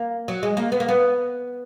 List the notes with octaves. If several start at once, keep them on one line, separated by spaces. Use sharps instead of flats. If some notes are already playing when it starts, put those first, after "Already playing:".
Already playing: A#3
F#3
G#3
A#3
B3
A#3
B3